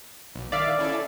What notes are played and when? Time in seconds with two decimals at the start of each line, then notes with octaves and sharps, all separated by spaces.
0.35 B1
0.52 D#3 D5 E5 F5
0.79 C#4 E4 A4